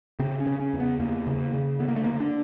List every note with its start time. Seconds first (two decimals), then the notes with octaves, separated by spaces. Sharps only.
0.19 C#3 C4
0.40 C#4
0.47 C#3
0.60 C#4
0.73 E2
0.80 B3
1.00 E2 A#3
1.27 C#3
1.53 C#3
1.80 D3 B3
1.88 A#3
1.96 A3
2.04 D3 A#3
2.20 D4